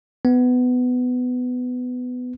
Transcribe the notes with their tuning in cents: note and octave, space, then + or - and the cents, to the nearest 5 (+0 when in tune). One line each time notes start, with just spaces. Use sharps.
B3 +15